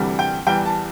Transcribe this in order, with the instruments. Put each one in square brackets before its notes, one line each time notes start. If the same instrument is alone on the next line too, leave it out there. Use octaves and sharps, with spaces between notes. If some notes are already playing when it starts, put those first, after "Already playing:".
Already playing: [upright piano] D2 C3 E3 G3
G5
E2 E3 G3 G5
A5